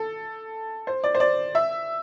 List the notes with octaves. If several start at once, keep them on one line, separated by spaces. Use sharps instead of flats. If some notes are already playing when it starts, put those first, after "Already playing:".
Already playing: A4
C5
D5
C5
D5
E5